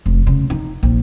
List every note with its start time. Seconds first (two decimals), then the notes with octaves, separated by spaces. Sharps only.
0.06 F1
0.27 C#3
0.50 D#4
0.83 A#1